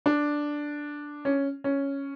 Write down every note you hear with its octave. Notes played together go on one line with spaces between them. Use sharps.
D4
C#4
C#4